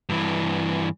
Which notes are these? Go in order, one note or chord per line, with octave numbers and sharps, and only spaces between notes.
G2 E3